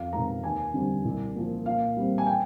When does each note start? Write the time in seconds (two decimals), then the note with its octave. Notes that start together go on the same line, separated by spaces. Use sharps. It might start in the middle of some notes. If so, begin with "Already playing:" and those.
Already playing: F2 F5
0.13 C3 D#3 G#3 A#5
0.43 D#2 G#5
0.74 D3 G3 C4
1.05 C2
1.35 A#2 F3
1.66 A#2 F5
1.97 G3 C4
2.18 G#5
2.27 G5